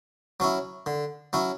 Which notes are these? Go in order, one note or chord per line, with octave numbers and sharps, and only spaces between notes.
F#3 C#4 E4
D3
F#3 C#4 E4